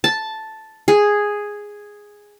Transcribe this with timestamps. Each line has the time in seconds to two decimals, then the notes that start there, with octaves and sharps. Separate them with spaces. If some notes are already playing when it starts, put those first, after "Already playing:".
0.04 A5
0.88 G#4